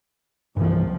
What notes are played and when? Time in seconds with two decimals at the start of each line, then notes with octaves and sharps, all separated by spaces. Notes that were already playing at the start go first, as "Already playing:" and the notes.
0.57 F#1 C2 G2 E3 F3